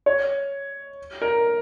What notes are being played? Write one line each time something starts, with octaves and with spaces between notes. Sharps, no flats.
C#5
A#4